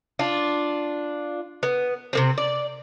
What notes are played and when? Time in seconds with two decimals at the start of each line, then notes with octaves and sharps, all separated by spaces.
0.19 D4 F4
1.63 B3
2.13 C3 A#3 C4
2.38 D5